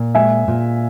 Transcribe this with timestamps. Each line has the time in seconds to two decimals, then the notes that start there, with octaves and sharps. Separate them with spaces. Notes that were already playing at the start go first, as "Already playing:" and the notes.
Already playing: A#2
0.15 G#3 E5 G#5
0.48 A#2